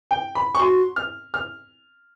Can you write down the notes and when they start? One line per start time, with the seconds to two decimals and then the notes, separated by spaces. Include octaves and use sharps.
0.11 G5
0.35 B5
0.55 C#6
0.59 F#4 C6
0.96 F6
1.34 F6